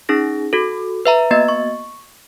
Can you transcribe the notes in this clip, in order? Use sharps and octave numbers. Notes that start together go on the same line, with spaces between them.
C#4 D#4 G#4 A#6
F#4 A4
B4 E5 A#5
A#3 B3 F#4 D#5 A6
C#6